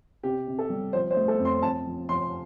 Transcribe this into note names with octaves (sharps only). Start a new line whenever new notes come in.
C3 G4
C3
A4
G3
F3 C5
C5
A3
A4
F2
C6
F2 A5
F3
F3 C6